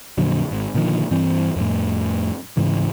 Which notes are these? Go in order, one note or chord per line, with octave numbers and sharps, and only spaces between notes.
F2 A#2 D3 F#3
G#1
A#2 D3 D#3 F3
G2 E3 C4
F2 A2
G#2 C#3 E3